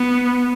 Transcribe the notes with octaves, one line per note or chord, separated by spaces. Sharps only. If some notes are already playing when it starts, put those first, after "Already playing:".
Already playing: B3